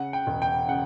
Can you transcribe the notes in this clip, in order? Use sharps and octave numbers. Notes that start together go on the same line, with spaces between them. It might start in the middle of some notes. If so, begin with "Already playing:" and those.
Already playing: C#3 F#5
G5
E1
G5
C#3 F#5